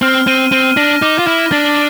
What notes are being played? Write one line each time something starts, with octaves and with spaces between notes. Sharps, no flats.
C4 F6
C4 D#7
C4 D#7
D4 A#6
D#4 D6
F4
E4 F6
D4 A6